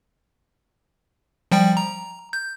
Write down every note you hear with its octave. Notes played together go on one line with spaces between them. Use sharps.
F3 G3 G5
A#5
G6